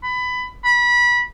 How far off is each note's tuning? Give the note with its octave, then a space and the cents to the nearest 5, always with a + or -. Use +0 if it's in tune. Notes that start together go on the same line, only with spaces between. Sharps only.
B5 +20
B5 -25